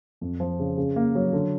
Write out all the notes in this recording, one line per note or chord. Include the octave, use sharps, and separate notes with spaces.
F2
F3
C#3
C#3
A#3
F#3
D3